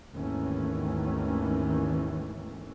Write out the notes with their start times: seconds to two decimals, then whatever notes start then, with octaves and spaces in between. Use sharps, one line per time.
0.14 G#1 D#2 D#3 E3 A3 C#4